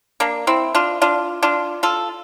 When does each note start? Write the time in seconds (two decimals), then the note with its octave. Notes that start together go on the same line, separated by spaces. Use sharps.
0.20 A#3 D4
0.47 C4 E4
0.75 D4 F4
1.02 D4 F4
1.43 D4 F4
1.83 F4 A4